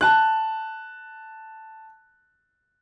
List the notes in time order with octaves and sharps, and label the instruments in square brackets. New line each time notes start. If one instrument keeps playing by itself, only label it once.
[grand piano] A5 F#6